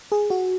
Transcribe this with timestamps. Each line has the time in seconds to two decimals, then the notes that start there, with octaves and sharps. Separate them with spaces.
0.12 G#4
0.30 F#4